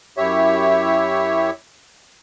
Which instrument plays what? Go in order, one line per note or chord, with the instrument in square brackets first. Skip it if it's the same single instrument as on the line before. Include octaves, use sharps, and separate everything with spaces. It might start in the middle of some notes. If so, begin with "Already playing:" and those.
[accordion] F#2 E4 G4 C#5 E5